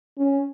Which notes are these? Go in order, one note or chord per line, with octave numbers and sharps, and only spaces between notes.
C#4